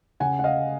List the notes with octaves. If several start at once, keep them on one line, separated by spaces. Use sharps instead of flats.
C#3 F#5 G#5
F#5
D#5 F5